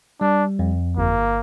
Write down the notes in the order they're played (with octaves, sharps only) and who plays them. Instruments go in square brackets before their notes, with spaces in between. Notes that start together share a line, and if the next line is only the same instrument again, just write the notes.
[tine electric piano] G3 [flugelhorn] D4
[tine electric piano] F2
[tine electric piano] G1 [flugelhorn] A#3